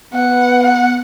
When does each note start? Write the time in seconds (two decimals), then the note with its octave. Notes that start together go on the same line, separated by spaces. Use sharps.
0.13 B3 F#5
0.63 F#5